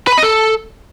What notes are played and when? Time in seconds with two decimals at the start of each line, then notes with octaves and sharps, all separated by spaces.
0.07 B4
0.12 B5
0.18 D#5
0.23 A4